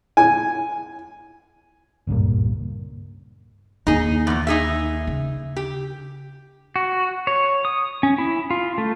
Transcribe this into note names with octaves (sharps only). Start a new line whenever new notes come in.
G#5
F#1 C#2 G2 A#2
D#2 D#4 G#4
E2 A#2
D#4 G#4 E5
C#3
G4
F#4
C#5
D#6
C#4
E4
F4
A3